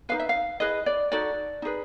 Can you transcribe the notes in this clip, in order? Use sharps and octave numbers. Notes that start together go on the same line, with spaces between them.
D#4 G#4 B4 F5
E5
F5
E4 G#4 B4 D#5
D5
D#4 F#4 A4 D5
D#4 G#4 B4